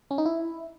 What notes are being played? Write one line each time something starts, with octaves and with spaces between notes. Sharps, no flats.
C#4
D#4
E4